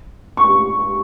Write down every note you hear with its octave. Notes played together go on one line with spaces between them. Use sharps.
C#6